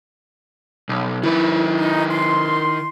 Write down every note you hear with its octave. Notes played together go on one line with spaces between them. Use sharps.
B1
D#3 E4 B4
D#4
C6